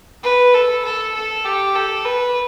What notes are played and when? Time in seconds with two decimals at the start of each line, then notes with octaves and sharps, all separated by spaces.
0.24 B4
0.54 A4
0.85 A4
1.15 A4
1.45 G4
1.75 A4
2.05 B4